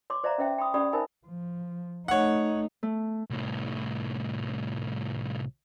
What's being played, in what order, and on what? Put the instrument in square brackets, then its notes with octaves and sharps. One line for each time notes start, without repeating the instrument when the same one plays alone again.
[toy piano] C#5 C6 D6
C5 D5 E5 F5 A#5
C#4 C5 E5 G5
G5 B5 C6 D#6
C#4 G4 D5 B5 D#6
D#4 A#4 C5 E5 G#5 B5
[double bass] F3
[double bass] A3 D#4 [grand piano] C#5 F#5
[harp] A3
[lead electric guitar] C2 A2